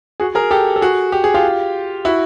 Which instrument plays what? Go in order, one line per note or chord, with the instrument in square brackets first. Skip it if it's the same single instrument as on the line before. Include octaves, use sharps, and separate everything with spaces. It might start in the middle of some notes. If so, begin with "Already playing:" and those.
[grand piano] F#4 G#4
G#4 A#4
G4 A4
A4
F#4 G#4
G4
G#4
F4 G4
E4 F#4